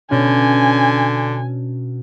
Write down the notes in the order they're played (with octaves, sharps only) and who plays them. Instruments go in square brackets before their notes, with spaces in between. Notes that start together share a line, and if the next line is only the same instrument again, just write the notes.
[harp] B2 B3 D4 [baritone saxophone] D3 [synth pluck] C#4 [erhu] G#5